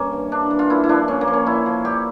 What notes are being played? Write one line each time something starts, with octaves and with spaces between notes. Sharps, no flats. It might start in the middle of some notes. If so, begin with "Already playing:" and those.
Already playing: G2 A#3 C#4
E3
G2 D4
E3
F4
A#2 E4
E4
F3 D4
A#2 C#4
A#3
F3
C#4
A#2 E4
F3
A#2 G4